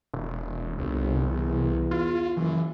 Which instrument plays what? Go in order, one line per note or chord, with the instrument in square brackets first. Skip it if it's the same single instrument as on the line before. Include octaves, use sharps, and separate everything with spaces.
[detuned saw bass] E1
[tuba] G1 [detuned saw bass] C2
[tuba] E2
[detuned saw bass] F4
[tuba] F#1 [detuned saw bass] E3